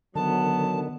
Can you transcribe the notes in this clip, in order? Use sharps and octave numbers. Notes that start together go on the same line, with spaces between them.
D3 D#3 F#3 B3 A5